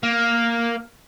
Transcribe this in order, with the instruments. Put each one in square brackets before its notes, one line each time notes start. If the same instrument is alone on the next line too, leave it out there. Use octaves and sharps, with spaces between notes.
[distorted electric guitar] A#3